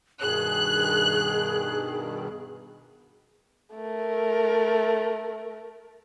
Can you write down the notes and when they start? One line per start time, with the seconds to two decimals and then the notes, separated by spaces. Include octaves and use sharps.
0.22 G2 B2 D#3 G#4 F#6
3.75 A3 A#4